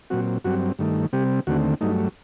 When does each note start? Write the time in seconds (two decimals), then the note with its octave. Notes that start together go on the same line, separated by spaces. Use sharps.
0.10 A#2 F#3 C4 F#4
0.45 G2 F#3 C4 F#4
0.79 G2 D#3 A3
1.13 C3 G3 C4 G4
1.47 D#2 D3 A3 C4 F#4
1.81 G2 F#3 A3 D#4